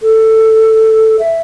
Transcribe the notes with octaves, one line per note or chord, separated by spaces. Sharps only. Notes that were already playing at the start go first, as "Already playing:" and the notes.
A4
E5